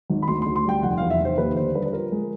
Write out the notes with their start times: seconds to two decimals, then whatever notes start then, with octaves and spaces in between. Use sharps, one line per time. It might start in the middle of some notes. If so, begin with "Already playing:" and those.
0.10 G#1
0.22 B5
0.28 D2 C6
0.42 D2 C6
0.56 C6
0.65 G3 G5
0.83 F1 F#5
0.98 E2 F5
1.10 E5
1.20 F1 C5
1.38 D#2 B4
1.57 D3 C5
1.75 G3 B4
1.86 B4
1.93 F3 A#4
2.12 G#3